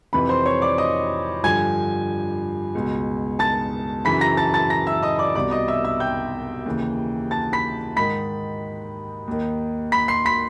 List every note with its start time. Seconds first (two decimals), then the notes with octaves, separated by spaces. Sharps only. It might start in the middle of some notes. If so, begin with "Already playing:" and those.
0.13 F2 C3 E3 B4 B5
0.29 C5 C6
0.45 C#5 C#6
0.62 D5 D6
0.78 D#5 D#6
1.44 G2 D3 F3 G#5 G#6
2.75 C#2 B2
3.39 A5 A6
4.05 F#2 C#3 E3 B5 B6
4.21 A#5 A#6
4.37 A5 A6
4.54 A5 A6
4.70 A#5 A#6
4.87 E5 E6
5.03 D#5 D#6
5.19 D5 D6
5.35 C2 B2 D5 D6
5.51 D#5 D#6
5.68 E5 E6
5.84 E5 E6
6.00 G5 G6
6.66 D#2 C#3 E3
7.31 A5 A6
7.53 B5 B6
7.96 G#2 D#3 B5 B6
9.27 D#2 D#3
9.92 B5 B6
10.08 C6 C7
10.25 B5 B6